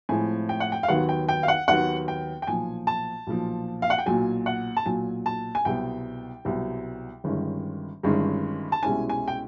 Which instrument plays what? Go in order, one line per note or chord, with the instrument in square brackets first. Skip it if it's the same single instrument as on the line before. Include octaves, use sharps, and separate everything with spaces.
[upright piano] A2 F3 G#3 C4 E4 G#5
G5
F#5
G5
F5
D#2 D#3 F#3 B3 F#5
G5
G5
F5
F#5
D#2 D#3 F#3 B3 F#5
G5
G5
B1 A#2 F3 G#5
A5
B1 A#2 F3
F5
F#5
G5
B1 A#2 F#3 G#5
F#5
A5
B1 A#2 F#3 G#5
A5
G#5
C2 B2 F#3 G5
C2 B2 F#3
G1 G2 D#3 G#3 C#4
G1 G2 D#3 G#3 C#4
A5
C2 B2 G#3 C#4 E4 G#5
G#5
G5